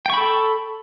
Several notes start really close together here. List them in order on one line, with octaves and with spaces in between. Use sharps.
G5 C#6 B5 A4